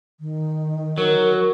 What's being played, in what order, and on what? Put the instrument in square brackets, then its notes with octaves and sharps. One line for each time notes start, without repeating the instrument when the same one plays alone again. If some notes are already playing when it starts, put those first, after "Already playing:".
[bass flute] D#3
[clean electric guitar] F#3 [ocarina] A#4